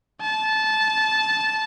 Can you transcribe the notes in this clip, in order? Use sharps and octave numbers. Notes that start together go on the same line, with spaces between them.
A5